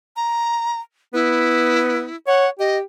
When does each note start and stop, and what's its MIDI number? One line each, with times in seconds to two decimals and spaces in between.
0.16 0.80 82
1.14 2.06 59
1.14 2.16 64
2.27 2.47 73
2.27 2.50 78
2.59 2.82 67
2.59 2.77 75